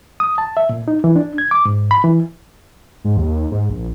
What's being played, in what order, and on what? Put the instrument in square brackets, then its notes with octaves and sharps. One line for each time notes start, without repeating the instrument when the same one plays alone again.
[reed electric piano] D#6
A5
E5
A#2
D#4
E3
D4
G#6
D6
G#2
B5
E3
[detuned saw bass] G#2
D#2
G#2
A#1